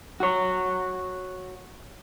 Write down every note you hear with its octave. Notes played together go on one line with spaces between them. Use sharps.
F#4 C#5